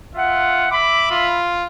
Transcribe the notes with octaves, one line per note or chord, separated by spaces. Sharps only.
F4 E5 F#5
E5 B5 D6
F4